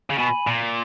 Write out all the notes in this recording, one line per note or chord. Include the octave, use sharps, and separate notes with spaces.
C#3
B2 G#5 B5
A#2